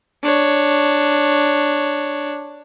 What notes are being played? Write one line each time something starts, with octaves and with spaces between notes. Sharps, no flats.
D4 C#5